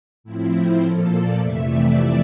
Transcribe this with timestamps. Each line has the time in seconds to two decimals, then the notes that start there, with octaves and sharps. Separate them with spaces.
0.24 A2 F3 C4 E4
0.53 C5
0.81 A#2 F3 A#3 A4
1.10 D5
1.38 F2 C3 E3 A3 E5
1.67 D5